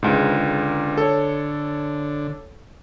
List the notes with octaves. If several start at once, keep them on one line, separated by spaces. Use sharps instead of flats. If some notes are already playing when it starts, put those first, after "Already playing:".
C#2 G#2 D3
A4 C#5